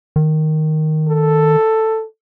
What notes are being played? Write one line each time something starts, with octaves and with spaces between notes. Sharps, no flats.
D#3
A4